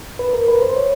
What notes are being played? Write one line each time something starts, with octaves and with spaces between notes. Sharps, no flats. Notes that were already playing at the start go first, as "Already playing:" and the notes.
B4
A#4
B4
C5
C#5